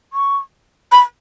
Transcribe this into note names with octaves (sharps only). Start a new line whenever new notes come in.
C#6
B5